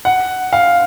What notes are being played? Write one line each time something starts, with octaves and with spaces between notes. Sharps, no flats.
F#5
F5